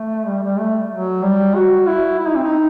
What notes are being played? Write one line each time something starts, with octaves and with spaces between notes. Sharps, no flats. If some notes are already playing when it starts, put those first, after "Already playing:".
Already playing: A3
G3
G3
A3
F#3
G3
F#4
E4
E4
D#4
C4
D#4